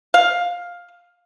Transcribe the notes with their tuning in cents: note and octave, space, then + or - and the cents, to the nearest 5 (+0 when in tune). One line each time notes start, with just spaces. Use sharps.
F5 +10